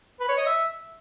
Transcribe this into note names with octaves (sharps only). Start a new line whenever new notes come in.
B4
C#5
D#5
E5